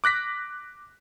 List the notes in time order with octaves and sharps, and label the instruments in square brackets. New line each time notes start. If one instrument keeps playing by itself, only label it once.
[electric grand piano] D6 F#6 A#6 B6